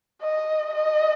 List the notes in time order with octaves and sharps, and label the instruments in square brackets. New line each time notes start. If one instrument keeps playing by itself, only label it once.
[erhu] D#5
D#5